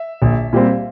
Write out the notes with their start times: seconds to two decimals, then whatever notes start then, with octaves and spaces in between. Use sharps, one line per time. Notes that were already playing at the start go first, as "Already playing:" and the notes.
Already playing: E5
0.22 A#1
0.53 A#2 G3 C4